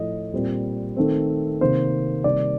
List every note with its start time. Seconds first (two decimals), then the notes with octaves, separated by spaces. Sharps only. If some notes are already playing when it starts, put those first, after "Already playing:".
Already playing: A2 F3 A3 D#5
0.33 A#2 G3 C4
0.96 D#3 A3 C4
1.61 C3 D#3 A#3 C5
2.24 C3 D#3 G3 A#3 D5